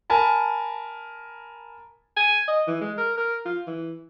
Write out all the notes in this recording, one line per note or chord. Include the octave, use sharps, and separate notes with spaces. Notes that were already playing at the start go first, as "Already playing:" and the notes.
A#4 G#5 A5 B5
G#5
D#5
E3
G#3
A#4
A#4
F4
E3